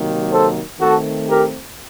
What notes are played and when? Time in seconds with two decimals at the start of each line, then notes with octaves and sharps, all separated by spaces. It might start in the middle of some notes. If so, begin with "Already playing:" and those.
Already playing: C3 D#3 F#3 A#3
0.32 A4 C5
0.80 D#3 A3 C4 F#4 A4
1.28 G4 A#4